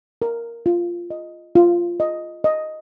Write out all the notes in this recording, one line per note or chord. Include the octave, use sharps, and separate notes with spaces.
A#4
F4
D#5
F4
D#5
D#5